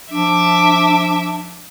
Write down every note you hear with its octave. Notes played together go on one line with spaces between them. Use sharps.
F3 D4 E5 D6